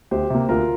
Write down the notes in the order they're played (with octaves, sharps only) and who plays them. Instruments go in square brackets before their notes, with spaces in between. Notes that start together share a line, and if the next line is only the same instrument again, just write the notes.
[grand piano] D2 G4 C5
C3 A#3
D2 F4 A#4